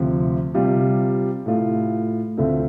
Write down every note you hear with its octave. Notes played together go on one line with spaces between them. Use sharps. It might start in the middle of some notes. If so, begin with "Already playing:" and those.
Already playing: D2 C3 F3
C3 G3 F4
A2 A3 F4
D2 D3 A3 C4 F4